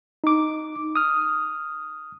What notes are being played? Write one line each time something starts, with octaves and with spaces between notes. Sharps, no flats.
D#4 D6
D#6 F6